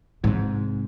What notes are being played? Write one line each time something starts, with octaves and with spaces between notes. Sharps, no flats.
G#2 C3